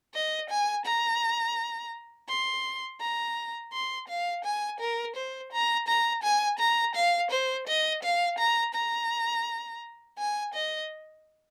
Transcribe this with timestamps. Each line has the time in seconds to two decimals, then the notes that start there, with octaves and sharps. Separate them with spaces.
0.14 D#5
0.50 G#5
0.85 A#5
2.29 C6
3.01 A#5
3.73 C6
4.09 F5
4.45 G#5
4.80 A#4
5.16 C5
5.52 A#5
5.88 A#5
6.23 G#5
6.59 A#5
6.95 F5
7.31 C5
7.67 D#5
8.03 F5
8.39 A#5
8.74 A#5
10.18 G#5
10.54 D#5